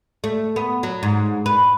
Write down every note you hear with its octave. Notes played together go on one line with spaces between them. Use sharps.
A3
B3
F#3
G#2
B4